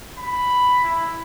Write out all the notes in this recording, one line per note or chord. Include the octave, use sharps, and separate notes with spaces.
B5
E4